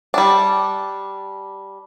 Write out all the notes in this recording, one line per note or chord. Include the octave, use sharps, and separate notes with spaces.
G3 D4